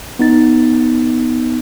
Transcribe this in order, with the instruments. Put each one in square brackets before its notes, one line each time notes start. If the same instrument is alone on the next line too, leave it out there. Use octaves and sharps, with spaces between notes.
[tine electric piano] B3 D#4 A6